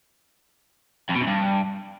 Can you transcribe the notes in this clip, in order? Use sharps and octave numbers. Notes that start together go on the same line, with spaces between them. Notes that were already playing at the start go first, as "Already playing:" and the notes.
F2
B2
F#2
G2